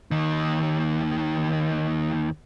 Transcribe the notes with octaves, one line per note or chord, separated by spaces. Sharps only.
D#2 D#3